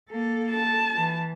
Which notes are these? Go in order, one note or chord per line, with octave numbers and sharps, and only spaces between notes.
A#3 A4
A5
E3